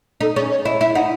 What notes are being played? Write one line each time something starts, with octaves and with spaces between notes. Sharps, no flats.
D#4 A4
C#4 G#4
C#5
E4 D#5
E4 E5
D#4 F#5